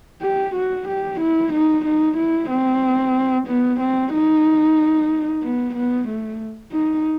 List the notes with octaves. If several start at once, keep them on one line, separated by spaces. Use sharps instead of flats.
G4
F#4
G4
E4
D#4
D#4
E4
C4
B3
C4
D#4
B3
B3
A3
D#4